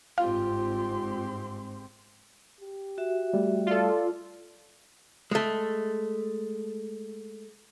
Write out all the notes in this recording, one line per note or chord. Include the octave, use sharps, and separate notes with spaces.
G1 G#2 C4 F4 G4 F5 C6
G4
F#4 E5
G3 A3
F4 A4 D5
G#3 A3